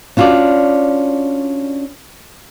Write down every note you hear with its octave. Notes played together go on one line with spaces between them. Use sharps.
C#4 D4 F4 F#4 D5